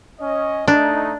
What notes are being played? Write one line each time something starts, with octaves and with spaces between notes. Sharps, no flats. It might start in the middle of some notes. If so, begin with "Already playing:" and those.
C#4 D#5
A3 D4 D#4